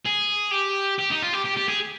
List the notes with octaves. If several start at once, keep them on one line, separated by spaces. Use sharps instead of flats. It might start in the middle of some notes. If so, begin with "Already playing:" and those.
G#4
G4
G4
D#4
F4
G4
G4
G4
G#4